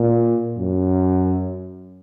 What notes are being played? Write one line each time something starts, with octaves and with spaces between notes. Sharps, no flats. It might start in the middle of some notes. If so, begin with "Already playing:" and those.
Already playing: A#2
F#2